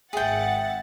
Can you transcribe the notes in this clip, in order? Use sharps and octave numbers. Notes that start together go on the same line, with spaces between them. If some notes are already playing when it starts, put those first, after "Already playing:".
G#1 G#4 E5 F#5 G5 A6